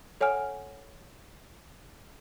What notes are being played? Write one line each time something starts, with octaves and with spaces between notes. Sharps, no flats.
A4 C#5 F#5 G#5 F6